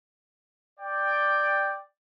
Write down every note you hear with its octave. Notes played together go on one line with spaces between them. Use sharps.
D5 G5